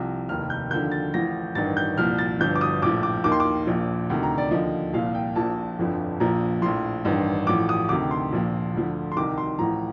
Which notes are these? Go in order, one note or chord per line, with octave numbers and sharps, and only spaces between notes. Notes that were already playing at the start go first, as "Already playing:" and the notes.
Already playing: C2 C3 F3
F1 D#2 D#3 F6
G6
D#2 D3 F3 G6
A6
A1 A2 F3 A#6
A1 G2 D#3 A6
G6
C2 A#2 F3 F6
A6
G1 G2 F3 G6
D6
D#6
A#1 A2 F3 D6
D6
D#2 D#3 D6
C6
D6
A#1 A#2 F3
D2 C3 D#3
A#5
D5
D#2 D3 F3 D#5
C2 A#2 F3 F5
G5
A#1 A#2 F3 A5
G1 F2 D3 F3
A#1 A#2 F3 A#5
A#1 A2 F3 C6
A1 G2 D#3
A1 A2 F3 D6
D#6
D2 C3 D#3 D6
C6
A#1 A#2 F3
D2 D3 F3
C6
C2 C3 D#3 D6
C6
A1 A2 F3 A#5